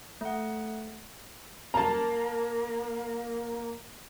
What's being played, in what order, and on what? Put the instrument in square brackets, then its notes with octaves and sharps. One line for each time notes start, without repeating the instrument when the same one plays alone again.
[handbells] A3 F#5
[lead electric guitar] A#3 [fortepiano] A5 A#5